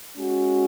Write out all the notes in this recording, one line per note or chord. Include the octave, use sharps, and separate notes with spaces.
G#3 C#4 F#4